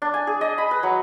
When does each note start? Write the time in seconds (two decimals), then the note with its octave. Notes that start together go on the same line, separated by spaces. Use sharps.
0.02 D4
0.14 G#5
0.27 G#4
0.41 D#5
0.58 B5
0.71 B4
0.83 F#3